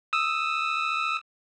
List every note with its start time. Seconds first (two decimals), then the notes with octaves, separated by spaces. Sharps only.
0.13 D#6 E6